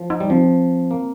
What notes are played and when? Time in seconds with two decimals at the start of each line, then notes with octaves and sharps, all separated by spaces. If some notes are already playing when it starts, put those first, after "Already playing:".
Already playing: F3
0.10 D#4
0.20 G3
0.30 F3 C4
0.91 A#3